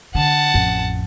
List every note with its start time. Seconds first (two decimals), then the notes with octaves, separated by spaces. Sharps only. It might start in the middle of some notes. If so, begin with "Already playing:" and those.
0.15 D3 F#5 A5
0.54 A1 F2